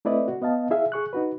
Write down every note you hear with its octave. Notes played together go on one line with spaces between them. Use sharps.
A3 C4 E4 B4 D5 D#5
F#4
B3 D#5 F5 A5
E4 G#4 E5 F5
G#4 C#6 F#6
D#4 F#4 B4